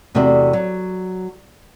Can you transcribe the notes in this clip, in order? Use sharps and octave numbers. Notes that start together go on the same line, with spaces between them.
E2 C3 A3 B3 F#4 D5
F#3